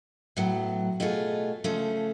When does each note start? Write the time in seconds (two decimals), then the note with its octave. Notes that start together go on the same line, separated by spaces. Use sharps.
0.37 A2 F#3 B3
1.00 B2 A3 F4 G#4
1.64 C#3 F3 A3